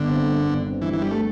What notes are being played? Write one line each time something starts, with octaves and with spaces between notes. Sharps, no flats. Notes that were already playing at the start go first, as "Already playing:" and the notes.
Already playing: G1 D3
C4
G2
G1
G2
C4
G2 E3
G2 E3
G3
A3